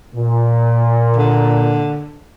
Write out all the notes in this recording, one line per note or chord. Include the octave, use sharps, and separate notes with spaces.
A#2
D3